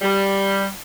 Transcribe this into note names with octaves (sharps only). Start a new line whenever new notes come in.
G3